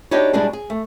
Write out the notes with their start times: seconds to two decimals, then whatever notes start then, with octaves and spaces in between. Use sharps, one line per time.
0.11 D4 D#4 F#4 G4 B4 C#5
0.33 B2 G3 G#3 D4 E4 G#4
0.53 G#4
0.70 A3